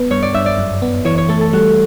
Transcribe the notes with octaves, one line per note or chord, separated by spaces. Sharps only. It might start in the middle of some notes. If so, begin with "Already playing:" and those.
Already playing: B3
G2 C#5
D5
G2 E5
D5
F#2
B3
E3 C#5
C#5
A3 A4
A4
G3 F#4